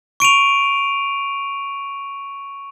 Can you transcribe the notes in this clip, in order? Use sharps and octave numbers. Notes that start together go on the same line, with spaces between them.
C#6 D7 D#7 F7